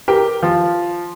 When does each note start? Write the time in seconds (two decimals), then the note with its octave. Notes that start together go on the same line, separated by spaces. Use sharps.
0.08 G4 A#4
0.42 F3